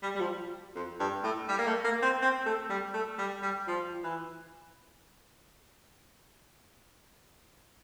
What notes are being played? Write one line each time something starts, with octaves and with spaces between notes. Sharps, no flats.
G3
G3
F3
F2
G2
A2
G3
A#3
A3
A#3
C4
C4
A3
G3
A3
G3
G3
F3
E3